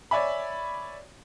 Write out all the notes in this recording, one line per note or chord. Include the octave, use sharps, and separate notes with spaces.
C#5 D5 E5 G#5 B5